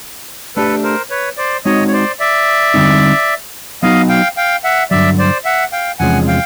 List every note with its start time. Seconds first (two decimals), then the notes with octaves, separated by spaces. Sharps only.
0.56 A3 D4 G4 A4 B4
0.83 A#4 C5
1.10 B4 C#5
1.37 C5 D5
1.65 G#3 C4 D#4 F#4 C#5 D#5
1.88 C#5
1.93 C5 D5
2.20 D5 E5
2.74 D3 G3 C4 D#4
3.83 F#3 B3 D#4 F#4 D#5 F5
4.09 F5 G5
4.37 F5 G5
4.64 E5 F#5
4.91 G2 D3 F#3 D5 E5
5.18 C5 D5
5.45 E5 F#5
5.72 F5 G5
5.99 E2 C3 F3 G#3 C#4 F#5 G#5
6.28 F5 G5